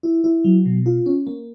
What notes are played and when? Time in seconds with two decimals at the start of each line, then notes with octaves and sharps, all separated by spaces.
0.03 E4
0.24 E4
0.44 F#3
0.66 B2
0.86 F4
1.06 C#4
1.27 A#3